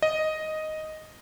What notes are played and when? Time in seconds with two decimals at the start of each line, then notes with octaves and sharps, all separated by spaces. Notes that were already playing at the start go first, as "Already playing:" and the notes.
0.02 D#5